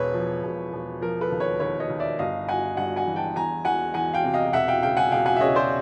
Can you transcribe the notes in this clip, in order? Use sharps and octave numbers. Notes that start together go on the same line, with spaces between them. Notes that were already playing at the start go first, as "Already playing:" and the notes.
Already playing: E1 B4 C#5
F3
E1
E1
F3 A#4
A4 B4
D#2
B4 C#5
D#2 B4 C#5
C#5 D#5
D#2
D5 E5
G1 D#5 F5
G1 F#5 G#5
G2 F#5 G#5
F#5 G#5
E3
G5 A5
E2 G#5 A#5
E2 F#5 G#5
E2 F#5 G#5
F5 G5
C3
D#5 F5
E1 E5 F#5
F5 G5
C#3 F5 G5
F#5 G#5
E1 F5 G5
F#5 G#5
E5
C#3 C#5 D#5
C5 D5